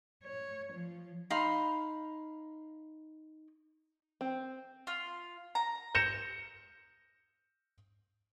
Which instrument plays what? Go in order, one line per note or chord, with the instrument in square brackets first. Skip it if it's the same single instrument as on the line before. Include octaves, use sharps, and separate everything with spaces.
[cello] C#5
F3
[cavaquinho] D#4 F5 B5 C6
[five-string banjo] C4
[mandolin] F4
A#5
[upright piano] G6 A#6 C#7 E7